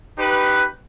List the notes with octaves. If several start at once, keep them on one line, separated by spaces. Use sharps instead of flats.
D#4 G4 B4